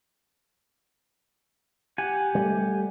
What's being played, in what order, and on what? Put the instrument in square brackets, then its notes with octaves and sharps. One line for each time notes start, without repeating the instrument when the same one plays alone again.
[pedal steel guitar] G4 F#5 G#5
[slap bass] G3 A3